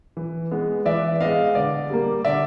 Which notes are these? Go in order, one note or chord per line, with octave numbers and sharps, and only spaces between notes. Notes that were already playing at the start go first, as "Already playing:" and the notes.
E3
G#3 B3
E3 D5 E5
G#3 B3 D#5 F5
D3 D5
G3 A#3
D3 D5 E5